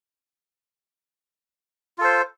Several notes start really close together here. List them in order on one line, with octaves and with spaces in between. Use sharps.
F4 A4 C5